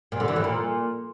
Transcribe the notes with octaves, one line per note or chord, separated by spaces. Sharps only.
A#2
D3
E3
A2
A#2